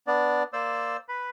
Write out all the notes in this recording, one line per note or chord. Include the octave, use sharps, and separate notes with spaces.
B3 D4 D5
A#3 C5 D5 E6
B4 B5